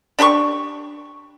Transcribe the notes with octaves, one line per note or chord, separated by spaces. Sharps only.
D4 G4 B5 C#6